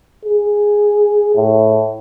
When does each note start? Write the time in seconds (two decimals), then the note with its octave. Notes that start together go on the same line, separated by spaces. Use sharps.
0.25 G#4
1.35 A2